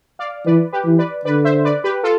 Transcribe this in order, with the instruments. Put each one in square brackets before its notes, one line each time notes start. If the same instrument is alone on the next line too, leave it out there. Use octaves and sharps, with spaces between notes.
[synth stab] D5 F5
[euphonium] E3 [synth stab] B4 D5
[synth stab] G4 B4
[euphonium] E3
[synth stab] B4 D5
[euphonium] D3 [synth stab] B4 D5
[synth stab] C5 E5
B4 D5
G4 B4
F4 A4